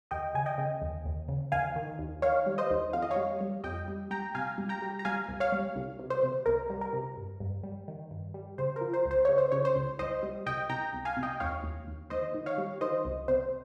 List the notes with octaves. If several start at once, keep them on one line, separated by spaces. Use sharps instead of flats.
D#2 D#5 G5
C#3 G#5
D#5 G5
C#3
D#2
D#2
C#3
D#2 F5 G#5
D#3
D#2
D#3 C#5 F5
G3
C5 D#5
D#2
F2 F5
D#5
C#5 F5
G3
G3
F2 D#5 G5
G3
G3 G5 A#5
C3 F5 G#5
G3
G5 A#5
G3
A#5
G3 F5 G#5
C2
C#5 F5
G3
C2
C3
C5
C3
C2 A#4
G3
A#4
C3
G2
G2
G3
D#3
G2
G3
C#3 C5
F3 A#4
C5
C#2
C5
C#3 C#5
C5
C#3 C#5
C5
C#2
C2 C5 D#5
G3
C2 D#5 G5
C2 G5 A#5
C2
F5 G#5
C3
D#5 G5
D#2 C#5 F5
D#2
D#2
D#2 C5 D#5
D#3
C#5 F5
G3
D#3 C5 D#5
C2
C3 C5